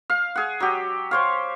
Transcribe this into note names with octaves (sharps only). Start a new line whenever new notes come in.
F5
G#4 F#5
F#3 G4
C5 C#5 F5